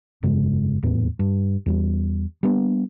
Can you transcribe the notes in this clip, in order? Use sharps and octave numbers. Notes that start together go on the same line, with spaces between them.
F1 G2 C#3 G#3
D#1 E2 A2 B3
G2
E2 G3 B3
G3 A#3 B3 D4